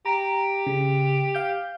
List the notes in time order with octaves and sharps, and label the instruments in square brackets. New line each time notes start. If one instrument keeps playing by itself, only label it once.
[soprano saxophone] G4 [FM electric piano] A#5
[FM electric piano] C#3
F5 G6